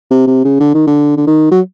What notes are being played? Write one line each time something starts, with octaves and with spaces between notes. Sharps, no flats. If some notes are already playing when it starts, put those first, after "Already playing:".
C3
C3
C#3
D3
D#3
D3
D3
D#3
F#3